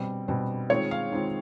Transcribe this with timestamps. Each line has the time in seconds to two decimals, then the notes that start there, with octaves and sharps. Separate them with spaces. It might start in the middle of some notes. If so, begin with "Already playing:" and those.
Already playing: B2 G3 C4
0.28 B2 G3 C4
0.70 D#3 G#3 C4 F4 C#5
0.91 F5
1.11 D#3 G#3 C4 F4